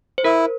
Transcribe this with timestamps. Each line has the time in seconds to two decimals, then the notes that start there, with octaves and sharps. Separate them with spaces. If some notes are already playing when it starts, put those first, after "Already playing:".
0.18 C5
0.24 E4 A#4